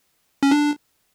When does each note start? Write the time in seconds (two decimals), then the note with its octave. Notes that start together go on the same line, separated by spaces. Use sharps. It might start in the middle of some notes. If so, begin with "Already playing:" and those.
0.43 C#4
0.51 D4